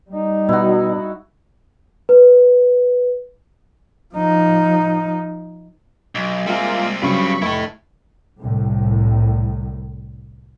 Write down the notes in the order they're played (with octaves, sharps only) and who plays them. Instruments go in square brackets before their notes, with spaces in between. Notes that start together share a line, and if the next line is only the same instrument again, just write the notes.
[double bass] G3 D#4
[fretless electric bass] B2 [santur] E4 F#4
[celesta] B4
[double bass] F3 D#4
[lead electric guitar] B1
[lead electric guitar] G3 C4 [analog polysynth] G#3 A#3 F4 [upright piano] E5 F5 G#5
[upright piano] G2 C#3 F#3 [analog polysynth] B5 C#6
[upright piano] F1 [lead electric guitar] E4 A4
[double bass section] C2 A2